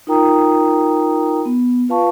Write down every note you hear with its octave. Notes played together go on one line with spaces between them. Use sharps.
D#4 F4 A#4 G5 A#5 D#6
B3
F4 B4 F5 A5 C#6